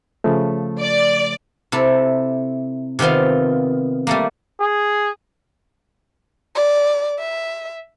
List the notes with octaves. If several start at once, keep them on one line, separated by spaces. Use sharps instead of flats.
C#3 F3 A3
D5
C3 E4 A4
C3 D#3 B3 C4 F4
G3 A3 A#3
G#4
D5
E5